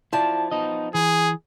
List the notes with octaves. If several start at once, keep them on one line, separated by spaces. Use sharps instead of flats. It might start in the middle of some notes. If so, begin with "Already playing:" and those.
F3 E4 D5 A5
B3 D#4 D#5
E3 G#4